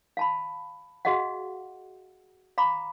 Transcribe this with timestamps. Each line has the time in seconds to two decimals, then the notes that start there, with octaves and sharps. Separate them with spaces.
0.17 F5 A5 B5
1.05 F#4 G#4 D#5 F5 F#5
2.58 F5 A#5 B5 D6